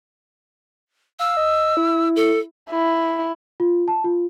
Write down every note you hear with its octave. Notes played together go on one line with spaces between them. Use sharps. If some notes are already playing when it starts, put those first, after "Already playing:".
F5 E6
D#5
E4
A4
E4
F4
A5
F4